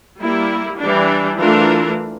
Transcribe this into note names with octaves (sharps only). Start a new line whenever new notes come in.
G3 A#3 E4
E3 G3 D4
E3 A3 D4 F4 A#4